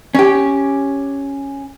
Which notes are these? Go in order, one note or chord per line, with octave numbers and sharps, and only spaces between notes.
C#4 G4